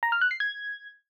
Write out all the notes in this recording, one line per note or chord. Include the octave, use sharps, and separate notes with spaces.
A#5
F6
F#6
C7
G#6